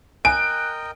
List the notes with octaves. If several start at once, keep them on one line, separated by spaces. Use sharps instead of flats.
A#4 D#5 G5 G#5 F#6 D7